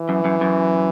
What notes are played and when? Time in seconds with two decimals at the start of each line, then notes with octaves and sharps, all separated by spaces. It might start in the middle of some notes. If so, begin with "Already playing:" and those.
Already playing: E3
0.09 F#2
0.25 F#2
0.41 F#2